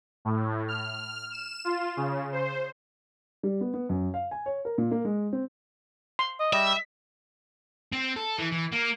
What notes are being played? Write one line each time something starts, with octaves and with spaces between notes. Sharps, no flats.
A2
F6
E7
F4
C#3
C5
G3
B3
B3
F#2
F5
G#5
C#5
A#4
A#2
A#3
G#3
C4
C6
D#5
G3 D#5 E5
C4
A4
E3
E3
A#3